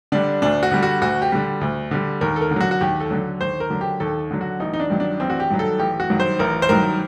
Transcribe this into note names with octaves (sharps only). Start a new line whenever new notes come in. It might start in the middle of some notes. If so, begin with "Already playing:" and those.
D3 G3 D4
D2 D4
F#4
D3 G3
F#4
D2 F#4
G4
D3 G3
D2
D3 G3
D#2 A#4
A4
A#4
D3
F#3 F#4
F#4
D#2 G4
A4
D3 F#3
D#2 C5
A#4
D3 F#3
G4
D#2 A4
D3 F#3
F#4
A1 D#4
D#4
D4
G2 D#3 F#3
D4
A1 C4
F#4
G4
G2 D#3 F#3
A4
A1 G4
F#4
G2 D#3 F#3
C5
A1 A#4
C5
G2 D#3 F#3 A#4